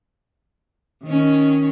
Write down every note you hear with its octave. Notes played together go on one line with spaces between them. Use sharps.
D#3 C#4